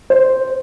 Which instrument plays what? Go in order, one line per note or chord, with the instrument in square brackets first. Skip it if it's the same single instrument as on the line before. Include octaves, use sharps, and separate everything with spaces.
[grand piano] C5